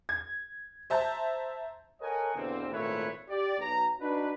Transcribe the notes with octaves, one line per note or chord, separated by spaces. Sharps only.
G#6
C5 E5 A5 A#5 G6
A4 A#4 C#5 D#5 F#5 G#5
E2 B2 D3 A#3 C4
G#1 A#2 A3 E4 B4 C#5
G4 D5
B1 A#5
D4 D#4 F#4 B4